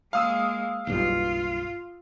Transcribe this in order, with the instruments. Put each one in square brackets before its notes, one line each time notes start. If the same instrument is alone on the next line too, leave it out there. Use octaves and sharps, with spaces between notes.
[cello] G#3 A#3 [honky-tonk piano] F5 D#6 E6
[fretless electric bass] F#1 B1 G2 [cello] F4